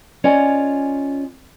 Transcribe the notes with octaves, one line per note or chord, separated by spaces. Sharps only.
C#4 F4 D5 D#5 G#5